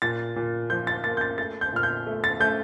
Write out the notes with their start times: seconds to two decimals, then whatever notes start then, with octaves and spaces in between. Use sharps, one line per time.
0.02 A#2 A6
0.36 A#2
0.70 F3 G6
0.87 A6
1.04 A#3 A6
1.17 G6
1.21 A6
1.38 A3 A6
1.61 G6
1.73 A#2 F6
1.83 G6
2.06 A3
2.24 A6
2.40 A3 G6